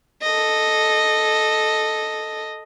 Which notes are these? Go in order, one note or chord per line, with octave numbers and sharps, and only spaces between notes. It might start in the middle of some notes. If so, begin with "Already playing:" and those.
A4 D#5